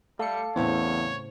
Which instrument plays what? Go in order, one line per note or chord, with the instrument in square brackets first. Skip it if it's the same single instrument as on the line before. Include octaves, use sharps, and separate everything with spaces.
[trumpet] G3 [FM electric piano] A3 D5 C#7 [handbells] A4 F5 A5
[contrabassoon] E2 [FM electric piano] A2 C#3 C4 [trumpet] C#5